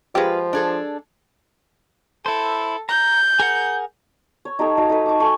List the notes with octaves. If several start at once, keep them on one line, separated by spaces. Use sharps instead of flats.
F3 G#3 F4 G4 B4
D4 G#4 A4
E4 A4 C5
A#5 G6
G#4 A#4 F#5
C#5
D#4 G4 A4 C#5
D#4 F#4 F5
D#4 A4 B4
C#6 D6
A4 G#5 B5 C#6